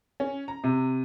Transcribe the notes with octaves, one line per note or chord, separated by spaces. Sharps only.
C#4
A#5
C3